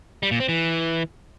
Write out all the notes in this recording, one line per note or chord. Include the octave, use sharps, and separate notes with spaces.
G3
A#2
C4
E3